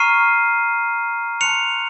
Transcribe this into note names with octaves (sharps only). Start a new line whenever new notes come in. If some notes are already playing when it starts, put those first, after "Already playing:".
Already playing: A#5 C#6 F6 C7 D#7
A5 C6 F#6 C#7 F7